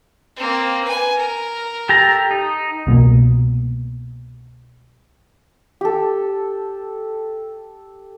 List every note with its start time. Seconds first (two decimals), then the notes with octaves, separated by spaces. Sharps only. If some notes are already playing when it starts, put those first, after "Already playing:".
0.36 A#3 C4
0.84 B4 G#5
1.17 A#4
1.89 G4 A4 A#5
2.31 D#4
2.87 C2 B2 F3 A#3
5.81 G4 A4